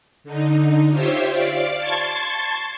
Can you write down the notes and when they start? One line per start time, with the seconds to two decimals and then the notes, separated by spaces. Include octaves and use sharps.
0.24 D3 D#4
0.91 F4 G4 C5 C#5 E5
1.31 D5 F5 D6
1.77 A5 C6 C#6 G#6 A6